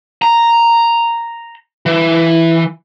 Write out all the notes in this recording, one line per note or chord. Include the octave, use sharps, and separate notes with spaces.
A#5
E3